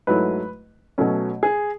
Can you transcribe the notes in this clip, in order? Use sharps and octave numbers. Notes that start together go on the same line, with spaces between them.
G#2 F#3 A3 E4 B4
B2 F#3 A3 C#4
G#4